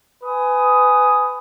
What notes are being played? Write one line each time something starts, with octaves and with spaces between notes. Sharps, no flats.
B4 G#5 D#6